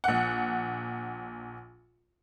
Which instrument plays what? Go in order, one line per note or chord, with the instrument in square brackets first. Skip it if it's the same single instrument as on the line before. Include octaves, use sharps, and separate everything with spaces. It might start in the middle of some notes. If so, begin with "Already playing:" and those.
[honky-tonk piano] A#1 F#5